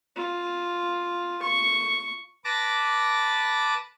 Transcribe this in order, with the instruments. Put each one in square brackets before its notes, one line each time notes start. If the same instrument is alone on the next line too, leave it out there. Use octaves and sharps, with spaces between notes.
[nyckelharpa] F4
C#6
[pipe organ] B4 A5 D6 A#6